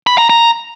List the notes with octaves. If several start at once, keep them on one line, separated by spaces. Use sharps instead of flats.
B5
A#5
A#5